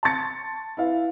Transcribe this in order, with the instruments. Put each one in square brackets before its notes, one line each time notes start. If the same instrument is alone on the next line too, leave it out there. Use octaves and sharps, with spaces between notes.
[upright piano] A5 C6 C#6 A6 C#7
E4 B4 F5